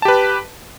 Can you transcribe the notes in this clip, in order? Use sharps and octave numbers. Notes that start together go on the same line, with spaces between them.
G4 B4 A5